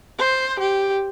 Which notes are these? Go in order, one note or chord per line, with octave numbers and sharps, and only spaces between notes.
C5
G4